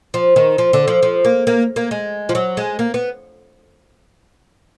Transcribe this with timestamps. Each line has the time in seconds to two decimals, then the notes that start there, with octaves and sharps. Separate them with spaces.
0.14 F3
0.36 D#3
0.58 F3
0.73 D3
0.88 F3
1.03 F3
1.25 A#3
1.47 A#3
1.76 A#3
1.91 G#3
2.29 F3
2.35 F#3
2.57 G#3
2.79 A#3
2.94 B3